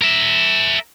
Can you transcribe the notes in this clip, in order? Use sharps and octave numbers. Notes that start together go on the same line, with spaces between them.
A#4 E5